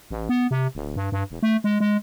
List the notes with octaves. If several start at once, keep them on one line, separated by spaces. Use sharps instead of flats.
A1
B3
C3
D1
G2
G2
E1
A3
G#3
G#3